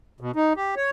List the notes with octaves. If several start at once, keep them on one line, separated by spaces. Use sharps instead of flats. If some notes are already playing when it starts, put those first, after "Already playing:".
B2
D#4
G4
C#5